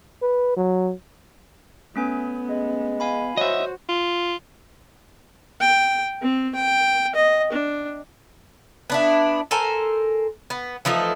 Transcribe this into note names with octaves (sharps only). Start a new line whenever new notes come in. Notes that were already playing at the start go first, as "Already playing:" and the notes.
B4
F#3
A3 B3 C#4 G#5
G#3
F5 G#5 B5
F#3 F#4 C5 D#5 E5
F4
G5
C4
G5
D#5
D4
B3 D4 E4
A4 A#4 C5 G#5
B3
E3 F3 A3 D#4